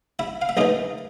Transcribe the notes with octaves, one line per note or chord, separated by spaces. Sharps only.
E4 E5
F5
E5
A#1 A2 E3 D#4 D#5